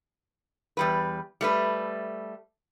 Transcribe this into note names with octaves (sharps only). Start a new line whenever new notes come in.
E2 G3 B4
G3 A3 B4